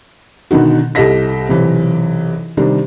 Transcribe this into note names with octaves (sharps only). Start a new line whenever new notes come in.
B2 D3 D#3 D#4 F#4
C2 G4 A4 D#5 A#6 B6
B1 C3 E3
C3 D#3 G3 D4